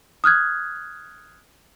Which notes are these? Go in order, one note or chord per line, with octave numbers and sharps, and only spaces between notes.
D#6 F6 F#6 G#6